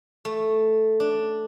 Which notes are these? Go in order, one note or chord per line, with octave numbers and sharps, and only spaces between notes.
A3
D4